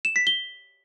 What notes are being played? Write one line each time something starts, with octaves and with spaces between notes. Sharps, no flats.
E7
B6
G7